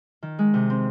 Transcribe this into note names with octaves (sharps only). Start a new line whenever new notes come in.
D#3
G#3
C3
C4